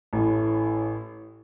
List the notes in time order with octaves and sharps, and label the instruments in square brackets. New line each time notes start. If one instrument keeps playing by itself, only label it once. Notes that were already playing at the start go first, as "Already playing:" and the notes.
[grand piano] A1 [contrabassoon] A2